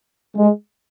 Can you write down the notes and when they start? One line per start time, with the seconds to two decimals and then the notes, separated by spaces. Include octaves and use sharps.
0.36 G#3